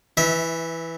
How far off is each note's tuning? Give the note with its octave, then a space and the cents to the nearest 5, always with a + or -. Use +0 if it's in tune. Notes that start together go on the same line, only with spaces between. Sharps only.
E3 +0 E5 -25